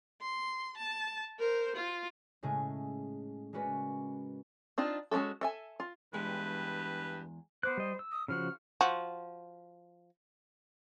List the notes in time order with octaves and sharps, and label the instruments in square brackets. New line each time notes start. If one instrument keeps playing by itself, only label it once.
[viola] C6
A5
A#4 C5
F4
[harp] A2 C#3 G#3 A3 G#4
G#3 A#3 C#4 F#4 B4 D5
[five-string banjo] C4 D4 D#4 F4
G#3 C#4 E4 F#4 A4
A4 E5 G#5
F4
[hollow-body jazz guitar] E2 G#3 [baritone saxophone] G2 [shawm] B4
[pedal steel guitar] B3 D6 F#6 [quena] C5
[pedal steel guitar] G3 D#5
E6
[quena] D#6
[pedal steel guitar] C#3 F3 F#4 [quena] F6
[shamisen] F3 F#4